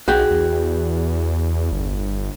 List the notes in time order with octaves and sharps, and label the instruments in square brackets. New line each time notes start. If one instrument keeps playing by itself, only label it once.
[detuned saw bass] B1 [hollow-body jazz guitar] F#4 G#4 G5
[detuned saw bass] E2
G1